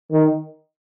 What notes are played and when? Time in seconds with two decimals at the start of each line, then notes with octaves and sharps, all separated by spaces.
0.12 D#3